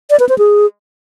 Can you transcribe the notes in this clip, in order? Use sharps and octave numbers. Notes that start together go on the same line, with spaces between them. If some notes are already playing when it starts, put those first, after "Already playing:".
D5
B4
C5
G#4